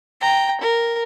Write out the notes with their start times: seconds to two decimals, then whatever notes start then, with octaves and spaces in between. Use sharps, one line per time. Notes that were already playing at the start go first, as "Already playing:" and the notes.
0.21 G5 A#5
0.61 A#4